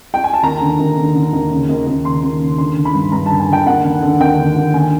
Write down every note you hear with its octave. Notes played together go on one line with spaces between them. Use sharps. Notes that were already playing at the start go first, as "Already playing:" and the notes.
G5
G#5
A5
D#2 A#5
D3
D#2
D3
D3
D#2
C#3
D#2
D#2
C#3 C6
D#2
C#3
D3 C6
D3
B5
G2
G2 A#5
D3 A5
G#5
D3 G5
D#2 F#5
D3
D3
D#2 G5
D3
D#2
D3 G#5